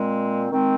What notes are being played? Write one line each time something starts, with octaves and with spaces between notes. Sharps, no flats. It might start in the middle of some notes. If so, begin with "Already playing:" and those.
Already playing: A#2 G#3 C4
D#3 G#3 C4